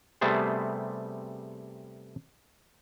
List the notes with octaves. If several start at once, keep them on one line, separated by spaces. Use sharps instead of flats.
C3 G3 A3 B3 G#4 C5